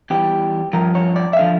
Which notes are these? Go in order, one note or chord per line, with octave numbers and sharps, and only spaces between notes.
E2 E3 G3 G4
G2 F3 A#4
C#5
D5
E5
D3 F3 F5